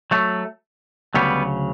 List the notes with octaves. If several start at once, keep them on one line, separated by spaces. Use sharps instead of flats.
F#3 A3
D2 C#3 F#3 G3 B3